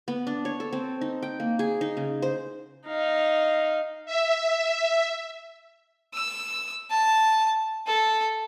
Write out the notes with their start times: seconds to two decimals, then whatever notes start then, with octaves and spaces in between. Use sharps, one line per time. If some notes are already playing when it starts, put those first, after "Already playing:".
0.08 B3
0.27 D4
0.45 C#5
0.60 A4
0.73 C4
1.01 D#4
1.23 G5
1.40 A#3
1.59 G#4
1.81 D#4
1.97 C#3
2.22 C5
2.86 D#4 F5
4.06 E5
6.14 E6
6.91 A5
7.87 A4